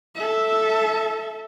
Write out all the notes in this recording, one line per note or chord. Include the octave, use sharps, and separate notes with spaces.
A4 E5